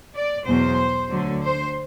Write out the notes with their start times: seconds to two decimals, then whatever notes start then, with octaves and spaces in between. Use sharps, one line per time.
0.16 D5
0.47 E2 B2 F#3 C5
1.11 D2 D3 F#3
1.43 C5